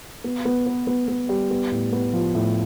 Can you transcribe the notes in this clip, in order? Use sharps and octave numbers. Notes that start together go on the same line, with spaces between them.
B3
B3
B3
B3
B3
G3
B3
A2
B3
F3
A2